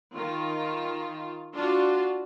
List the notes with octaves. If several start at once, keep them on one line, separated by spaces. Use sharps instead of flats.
D#3 F4
D4 F4 F#4